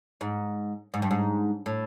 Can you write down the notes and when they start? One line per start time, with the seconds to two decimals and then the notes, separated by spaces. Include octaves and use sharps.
0.21 G#2
0.94 G#2
1.02 G2
1.11 G#2
1.66 A2